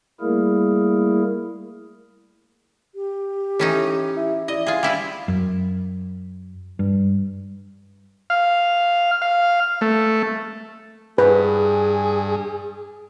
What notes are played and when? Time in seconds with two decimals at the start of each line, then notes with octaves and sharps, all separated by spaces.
0.21 G3 A3 A#3 E4 G#4 A#4
2.95 G4
3.59 A2 E3 C#4 D#4
4.17 E4
4.48 E4 D5 D#5
4.67 F4 G#4 F5
4.83 G3 E4 F4
5.28 F#2
6.79 G2
8.30 F5
9.22 F5
9.81 A3
11.18 G2 G#4 B4